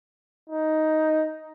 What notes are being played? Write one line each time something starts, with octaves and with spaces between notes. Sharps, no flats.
D#4